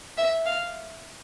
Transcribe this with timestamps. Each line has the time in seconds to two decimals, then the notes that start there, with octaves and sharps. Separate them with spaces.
0.17 E5
0.46 F5